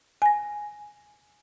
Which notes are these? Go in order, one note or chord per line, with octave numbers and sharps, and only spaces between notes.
G#5 A#6